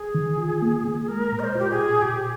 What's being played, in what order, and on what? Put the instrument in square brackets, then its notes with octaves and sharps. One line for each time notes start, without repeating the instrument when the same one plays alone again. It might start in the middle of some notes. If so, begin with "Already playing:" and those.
Already playing: [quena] G#4
[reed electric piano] D#3
F4
A#3
A#3
[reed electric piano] G#3 [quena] A#4
[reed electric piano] A#2
[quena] D#5
C5
[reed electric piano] F4 [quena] G4
[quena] G#4
[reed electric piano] A#2
[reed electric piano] A#2 [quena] G4